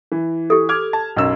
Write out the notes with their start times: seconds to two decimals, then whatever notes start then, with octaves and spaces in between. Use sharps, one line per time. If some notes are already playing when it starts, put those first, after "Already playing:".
0.12 E3
0.50 G4 A4
0.69 D6 F6 G#6
0.93 A5
1.16 B1 F#2 E6